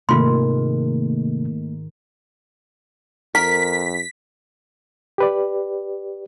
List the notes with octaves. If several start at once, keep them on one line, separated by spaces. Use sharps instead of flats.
G#2 C3 D#3 A3 A#3 F4 C6
F2 A#4 B6
G4 B4 D5